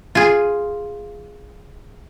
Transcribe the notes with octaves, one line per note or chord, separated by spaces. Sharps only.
F4 G#4